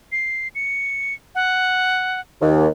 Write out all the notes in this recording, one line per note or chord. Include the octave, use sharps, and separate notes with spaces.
C7
C#7
F#5
D#2